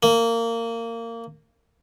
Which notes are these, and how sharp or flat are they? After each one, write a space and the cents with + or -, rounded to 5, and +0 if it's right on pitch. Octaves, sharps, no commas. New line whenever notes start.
A#3 -20